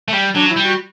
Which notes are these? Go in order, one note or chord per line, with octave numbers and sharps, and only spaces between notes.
A3
G3
F#3 D4
E4
G3
F#4